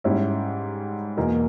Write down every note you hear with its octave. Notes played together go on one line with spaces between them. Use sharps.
G#2 G3 C#4 E4
E2 B2 A#3 D#4